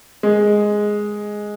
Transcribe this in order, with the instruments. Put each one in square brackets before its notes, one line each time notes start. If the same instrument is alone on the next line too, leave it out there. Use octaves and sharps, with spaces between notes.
[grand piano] G#3